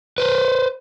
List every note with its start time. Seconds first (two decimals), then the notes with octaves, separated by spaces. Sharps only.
0.18 B4 C5